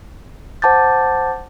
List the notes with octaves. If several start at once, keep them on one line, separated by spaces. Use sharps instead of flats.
C5 F#5 A5 D6 G6 A6